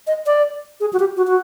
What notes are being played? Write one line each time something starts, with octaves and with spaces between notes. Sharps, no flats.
D#5
D5
G#4
F#4
G4
F#4
F#4